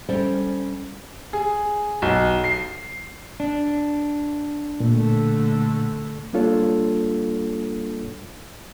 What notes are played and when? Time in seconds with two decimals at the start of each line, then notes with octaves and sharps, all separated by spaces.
0.09 G3 C#4 A4 C5 D5
1.33 G#4
2.02 B1
2.44 C7
3.40 D4
4.80 A#2 D3 A3
6.33 G3 A#3 D4 F4 A4 C#5